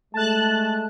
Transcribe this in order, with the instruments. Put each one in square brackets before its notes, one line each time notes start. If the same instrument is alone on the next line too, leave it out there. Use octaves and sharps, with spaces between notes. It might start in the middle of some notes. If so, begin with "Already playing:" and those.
[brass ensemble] G#3 A3 [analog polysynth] A5 F#6